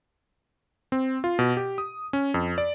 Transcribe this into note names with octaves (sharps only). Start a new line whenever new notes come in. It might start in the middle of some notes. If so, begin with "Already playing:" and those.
C4
F4
B2
G4
D#6
C#4
F2
D5